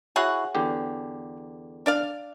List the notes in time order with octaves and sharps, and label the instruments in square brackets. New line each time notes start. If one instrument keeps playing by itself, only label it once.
[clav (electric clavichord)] E4 F#4 [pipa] G#4 C#5 F#5
[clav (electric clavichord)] E2 D3 G4
[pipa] D4 D5 F5